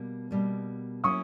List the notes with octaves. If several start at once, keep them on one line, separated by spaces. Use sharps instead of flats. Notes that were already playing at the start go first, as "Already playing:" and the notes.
Already playing: B2 G3 A#3
B2 G3 A#3
F#3 A#3 C#4 E4 C#6 D#6